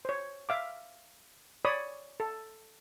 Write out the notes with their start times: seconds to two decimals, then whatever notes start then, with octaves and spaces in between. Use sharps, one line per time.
0.05 C5 C#5
0.49 E5 F5 D6
1.65 C#5 D5 B5 D#6
2.20 A4